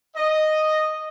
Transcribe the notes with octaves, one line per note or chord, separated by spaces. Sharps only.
D#5